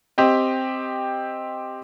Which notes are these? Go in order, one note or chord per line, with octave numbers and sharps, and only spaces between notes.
C4 G4 D#5